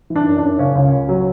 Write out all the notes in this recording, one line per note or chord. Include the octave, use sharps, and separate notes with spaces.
E3
D4
F#2
F#2 D4
C#3 C#4
C#2
C#2
F#3